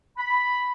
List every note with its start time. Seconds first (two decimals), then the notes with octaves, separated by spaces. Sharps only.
0.18 B5